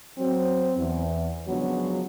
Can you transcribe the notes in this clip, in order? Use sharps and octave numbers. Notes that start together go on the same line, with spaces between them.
F#3 C4
E2
C#3 F3 F#3 G#3 B3 D4